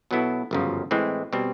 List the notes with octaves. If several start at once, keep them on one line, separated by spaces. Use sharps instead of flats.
B2 F#3 B3 E4 A4
G1 F#2 C#3 F3
A2 E3 G#3 C4
B2 G3 C4